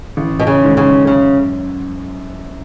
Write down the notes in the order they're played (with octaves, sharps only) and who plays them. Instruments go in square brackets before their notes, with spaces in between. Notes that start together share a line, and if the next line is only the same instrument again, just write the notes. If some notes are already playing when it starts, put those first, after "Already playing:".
[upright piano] A1
[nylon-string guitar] B2
C#3
[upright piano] G#2 D#3 G#3
[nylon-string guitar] C#3
[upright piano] F#2 [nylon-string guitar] C#3